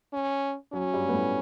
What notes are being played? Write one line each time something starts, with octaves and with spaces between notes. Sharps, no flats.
C#4
F#3 C#4
G2 G3
B3
A2 A3